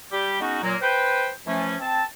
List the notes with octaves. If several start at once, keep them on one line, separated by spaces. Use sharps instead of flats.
G3 G4
G#3 B3 C#4 D#4 F#4
A#2 F#3 A#3
B4 C5 G5
E3 F3 A3 C#4
C4 A5